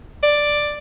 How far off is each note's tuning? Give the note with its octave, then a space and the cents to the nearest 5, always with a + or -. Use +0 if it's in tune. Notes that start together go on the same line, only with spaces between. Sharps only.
D5 +5